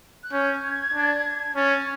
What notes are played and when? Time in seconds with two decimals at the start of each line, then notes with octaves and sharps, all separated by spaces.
0.23 F#6
0.32 C#4 G6
0.64 G#6
0.94 D4
1.56 C#4 A6